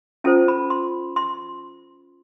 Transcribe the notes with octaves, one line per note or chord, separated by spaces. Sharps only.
C#4 F4 A4 C5 A5
B5
C6
C6